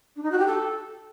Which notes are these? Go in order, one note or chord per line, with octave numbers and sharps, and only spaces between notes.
D4
D#4
F#4
G4
A4